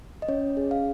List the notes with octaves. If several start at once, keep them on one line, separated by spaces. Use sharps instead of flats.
D#5
C#4 C#5
G#4
F5